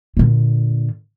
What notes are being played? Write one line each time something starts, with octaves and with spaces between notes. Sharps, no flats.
A#2 D3